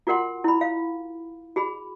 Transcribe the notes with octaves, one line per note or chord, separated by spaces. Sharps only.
F4 F#4 A#4 F#5 C6
E4 B5
F5
F#4 G#4 B5